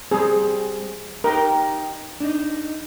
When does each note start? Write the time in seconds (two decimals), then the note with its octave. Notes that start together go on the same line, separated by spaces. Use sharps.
0.11 G3 C4 G#4
1.24 D#4 G4 A#4
2.21 D4 D#4